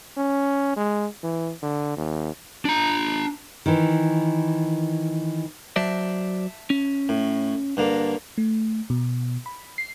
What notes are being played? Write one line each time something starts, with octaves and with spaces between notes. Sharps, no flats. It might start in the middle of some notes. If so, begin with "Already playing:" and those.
C#4
G#3
E3
D3
D#2
D4 A#5
D#3 E3
F#3 C5 D5 E5 A5
C#4
A2
G2 D3 A#3
A3
B2
B5
C7